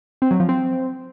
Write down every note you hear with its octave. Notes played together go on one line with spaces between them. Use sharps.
C4
F#3
F3
C4